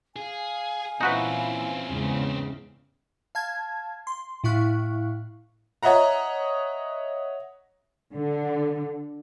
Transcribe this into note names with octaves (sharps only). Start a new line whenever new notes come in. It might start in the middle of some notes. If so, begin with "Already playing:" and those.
G#4 F5 G#5
A#2 E3 C4 C#4 D#4 E4 F#4 B4
E2 G#2 C#3
F5 A5 G#6
C6
A2 E4 F5 C#6 F#6
C#5 D#5 E5 F#5 A#5
D3